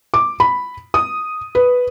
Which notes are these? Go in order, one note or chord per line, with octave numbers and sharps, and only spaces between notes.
D6
B5
D#6
B4